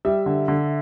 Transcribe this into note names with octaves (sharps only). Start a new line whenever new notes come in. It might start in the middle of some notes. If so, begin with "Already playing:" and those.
G3 E5
D3
D3